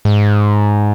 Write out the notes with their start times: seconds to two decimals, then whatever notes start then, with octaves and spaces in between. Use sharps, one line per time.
0.05 G#2